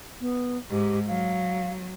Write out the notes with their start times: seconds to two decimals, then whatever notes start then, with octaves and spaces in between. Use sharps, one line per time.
0.21 B3
0.71 G#2 G4
1.08 F#3 F5